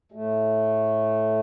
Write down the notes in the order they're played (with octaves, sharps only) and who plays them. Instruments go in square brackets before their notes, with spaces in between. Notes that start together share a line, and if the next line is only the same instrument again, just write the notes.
[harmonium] A2 A3